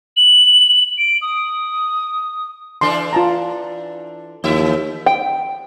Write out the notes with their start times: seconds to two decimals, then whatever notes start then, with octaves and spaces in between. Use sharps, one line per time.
0.17 F#7
0.98 D7
1.22 D#6
2.81 E3 D4 A4 C6
3.13 F4 A5 A#5
4.44 D#2 E3 E4 E5
5.06 G5